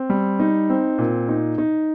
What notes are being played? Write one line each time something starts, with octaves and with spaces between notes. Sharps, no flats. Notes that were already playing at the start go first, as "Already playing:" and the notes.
Already playing: C4
G3
D#4
C4
A#2
D#4
D#4